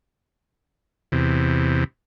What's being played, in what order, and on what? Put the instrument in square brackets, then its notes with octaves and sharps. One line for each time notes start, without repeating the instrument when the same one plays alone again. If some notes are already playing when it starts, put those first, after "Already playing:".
[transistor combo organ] E2 C3